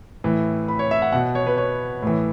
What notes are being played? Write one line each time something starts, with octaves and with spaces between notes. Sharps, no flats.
A2 E3
B5
C#5
E5
F#5
B2 F#5
C#5
B4
C#5
A2 E3